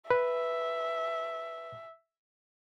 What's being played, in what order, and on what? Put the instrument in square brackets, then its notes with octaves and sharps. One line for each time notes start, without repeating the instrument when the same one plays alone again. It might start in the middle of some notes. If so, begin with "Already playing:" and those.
[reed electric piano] B4 [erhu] E5